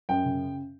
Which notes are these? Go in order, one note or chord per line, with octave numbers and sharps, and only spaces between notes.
F#2 G5
C#3